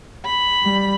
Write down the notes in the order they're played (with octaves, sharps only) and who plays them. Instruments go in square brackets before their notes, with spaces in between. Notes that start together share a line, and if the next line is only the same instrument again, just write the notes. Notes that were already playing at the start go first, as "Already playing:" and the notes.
[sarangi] B5
[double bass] G3